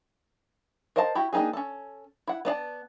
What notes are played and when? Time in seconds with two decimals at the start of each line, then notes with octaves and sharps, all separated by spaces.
0.96 A#4 C5 D#5 F5 A5
1.15 E4 F#4 G4
1.33 A#3 D4 D#4 G4 G#4
1.53 C#4 A4
2.27 E4 F#5
2.45 B3 D4 D5 A5